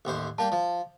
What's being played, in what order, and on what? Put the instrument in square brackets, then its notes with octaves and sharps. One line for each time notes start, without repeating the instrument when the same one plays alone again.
[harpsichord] A1 D#2 C5
[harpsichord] G3 A#3 G5 [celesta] A5
[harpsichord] F3